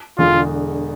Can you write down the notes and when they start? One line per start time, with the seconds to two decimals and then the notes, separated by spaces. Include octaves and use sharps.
0.18 E1 E2 D3 F4